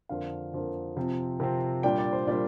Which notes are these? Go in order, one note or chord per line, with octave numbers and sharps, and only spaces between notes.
F2 D3 A#3 F5
F2 D3 A#3
C3 F3 C4
C3 F3 C4
A#2 G3 D4 G5
D5
C5
A#2 G3 D4 D5